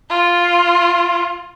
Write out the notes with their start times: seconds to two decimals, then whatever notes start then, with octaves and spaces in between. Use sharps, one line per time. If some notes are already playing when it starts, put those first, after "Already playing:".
0.10 F4